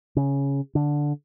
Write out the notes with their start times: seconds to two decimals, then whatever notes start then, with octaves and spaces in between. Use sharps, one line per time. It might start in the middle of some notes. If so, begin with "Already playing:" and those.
0.16 C#3
0.75 D3